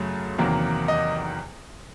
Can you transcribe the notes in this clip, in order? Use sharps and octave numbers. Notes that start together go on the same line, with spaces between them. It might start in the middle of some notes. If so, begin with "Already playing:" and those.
Already playing: F#2 C#3 F#3 A3
E2 C3 D#3 F#3 A#3
D#5